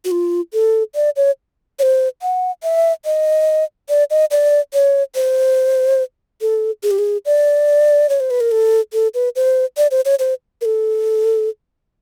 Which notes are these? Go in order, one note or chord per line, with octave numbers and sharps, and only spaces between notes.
F#4
F4
A4
D5
C#5
C#5
C5
F#5
E5
D#5
D5
D#5
D5
C#5
C5
A4
G#4
G4
G#4
D5
C#5
C5
B4
A#4
A4
A4
B4
C5
D5
C5
C#5
C5
A#4
A4